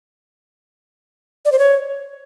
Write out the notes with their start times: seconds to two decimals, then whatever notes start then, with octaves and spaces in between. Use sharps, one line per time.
1.45 D5
1.52 C5
1.59 C#5